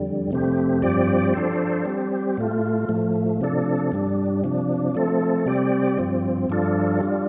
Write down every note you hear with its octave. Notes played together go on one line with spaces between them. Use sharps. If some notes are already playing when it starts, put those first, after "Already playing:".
Already playing: F2 D3 G3
F2 C3 A3 C4 G4
G2 F3 C4 G4 D5
F3 D4 A4 C5
G3 C4 G4
A2 A3 F4
A2 F3 A3
C3 F3 D4 A4
G2 G3 D4
C3 F3 D4
F3 A3 C4 A4
C3 G3 C4 G4 D5
G2 F3 C4
G2 F3 D4 F4 A4
G3 D4 F4